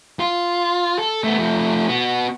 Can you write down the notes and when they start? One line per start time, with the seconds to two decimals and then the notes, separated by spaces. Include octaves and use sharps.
0.20 F4
0.99 A4
1.24 A3 B3
1.38 F3 A3
1.88 B3 F#4